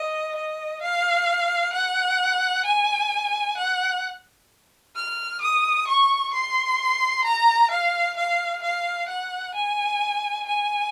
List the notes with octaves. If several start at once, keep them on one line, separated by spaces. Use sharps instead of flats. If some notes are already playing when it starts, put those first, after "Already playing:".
Already playing: D#5
D#5
F5
F#5
G#5
F#5
F6
D#6
C#6
C6
A#5
F5
F5
F5
F#5
G#5
G#5